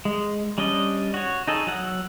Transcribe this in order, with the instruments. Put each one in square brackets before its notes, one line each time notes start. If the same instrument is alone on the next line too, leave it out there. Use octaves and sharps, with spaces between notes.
[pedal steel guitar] G#3
G3 C#4 D4 D#5
F#4 C#5
D#4 G#4 A4
F#3 F#5 E6